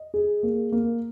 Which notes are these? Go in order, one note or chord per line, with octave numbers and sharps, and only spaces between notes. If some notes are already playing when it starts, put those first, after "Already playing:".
Already playing: D#5
G#4
A#3
A#3